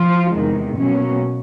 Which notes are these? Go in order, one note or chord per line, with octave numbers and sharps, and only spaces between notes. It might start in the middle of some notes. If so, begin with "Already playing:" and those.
Already playing: F3 F4
E2 C3 D#3 G#3
B2 F#3 A#3 C#4